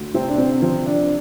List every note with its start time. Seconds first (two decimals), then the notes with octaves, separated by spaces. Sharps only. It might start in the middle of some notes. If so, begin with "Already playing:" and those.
Already playing: D2
0.14 C3 C4
0.28 D4
0.38 C4
0.62 F3 C4
0.86 D4